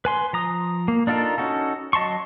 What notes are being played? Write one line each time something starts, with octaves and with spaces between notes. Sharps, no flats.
B4 G#5 C6
F3 A#5 D#6
A#3
D4 D#4 F4 A4 A#4
C#4 D#4 F#4 A4
F#3 D#5 A5 C6 C#6